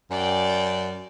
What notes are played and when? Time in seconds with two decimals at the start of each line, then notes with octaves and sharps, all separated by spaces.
0.11 F#2 D5 G5